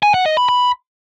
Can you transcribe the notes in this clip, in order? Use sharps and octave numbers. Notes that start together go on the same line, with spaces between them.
G#5
F#5
D#5
B5
B5